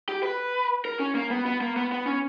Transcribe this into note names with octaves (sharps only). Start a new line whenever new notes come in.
G4
B4
A#4
C#4
A#3
B3
B3
A#3
B3
B3
C#4